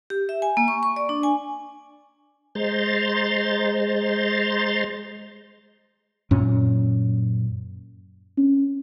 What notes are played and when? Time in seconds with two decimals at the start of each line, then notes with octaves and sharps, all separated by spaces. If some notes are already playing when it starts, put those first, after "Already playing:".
0.10 G4
0.29 E5
0.42 G#5
0.57 A#3
0.68 C#6
0.83 C#6
0.96 D5
1.09 D4
1.23 G#5
2.55 G#3 C5 A#5 C6 A6
6.31 F#2 A#2 C#4
8.37 C#4